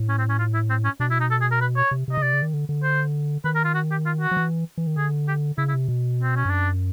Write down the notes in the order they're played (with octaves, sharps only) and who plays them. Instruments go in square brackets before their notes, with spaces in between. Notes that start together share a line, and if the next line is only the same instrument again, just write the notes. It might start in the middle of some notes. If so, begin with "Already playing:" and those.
Already playing: [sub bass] A2
[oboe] C#4
C4
C#4
F4
E4
C4
C#4
[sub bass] B2 [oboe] D4
[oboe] E4
D#4
A4
G#4
A#4
B4
C#5
[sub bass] C3
[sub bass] C3 [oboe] D#5
[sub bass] C#3
[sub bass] C3 [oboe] D5
[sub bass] C#3
D#3
D3
D3
[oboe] C5
[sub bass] D#3 [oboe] B4
[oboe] A#4
F4
F#4
G4
F4
F#4
[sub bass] F3
E3
E3
D#3
[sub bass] D3 [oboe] G#4
[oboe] G4
[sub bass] C#3 [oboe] E4
[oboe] E4
[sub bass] C3
B2
[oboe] C4
C#4
[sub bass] G2
[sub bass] F#2 [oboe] D4